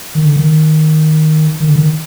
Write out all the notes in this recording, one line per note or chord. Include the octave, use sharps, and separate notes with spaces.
D#3
D3
D#3
D#3
D3
D#3